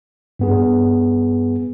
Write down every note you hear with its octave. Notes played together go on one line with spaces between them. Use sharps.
G2 B3 G#4